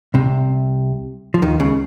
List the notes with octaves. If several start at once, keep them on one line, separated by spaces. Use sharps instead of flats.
C2 C3
F3
D#2 D#3
C#2 C#3